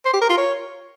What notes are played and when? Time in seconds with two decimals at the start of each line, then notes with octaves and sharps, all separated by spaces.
0.05 C5
0.13 G4
0.22 A#4
0.30 F4
0.38 C#5